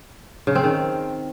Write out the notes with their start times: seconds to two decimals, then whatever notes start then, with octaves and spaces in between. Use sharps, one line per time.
0.47 C#3
0.55 C4
0.64 D#3